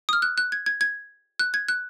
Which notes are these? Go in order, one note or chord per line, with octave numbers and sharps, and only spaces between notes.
D#6
F6
F#6
F#6
G#6
G#6
G#6
F#6
G#6
F#6